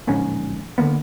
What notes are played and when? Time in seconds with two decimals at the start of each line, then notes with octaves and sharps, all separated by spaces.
0.07 D1 A#1 G#2 C#4
0.78 D3 E3 A#3 B3